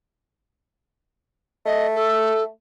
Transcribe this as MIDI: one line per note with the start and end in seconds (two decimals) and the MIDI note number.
1.66 2.49 57
1.66 1.87 75
1.95 2.43 69